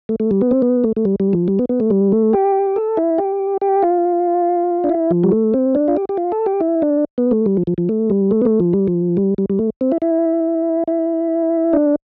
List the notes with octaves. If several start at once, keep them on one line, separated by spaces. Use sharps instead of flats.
A3
A3
G3
B3
C4
B3
A3
A3
G3
G3
F3
G3
B3
B3
A3
G3
A3
G4
A4
E4
G4
G4
F4
D4
E4
F3
G3
A3
C4
D4
F4
G4
G4
F4
A4
G4
E4
D4
B3
A3
G3
F3
F3
F3
A3
G3
A3
B3
A3
F3
G3
F3
G3
G3
G3
A3
C4
E4
E4
E4
D4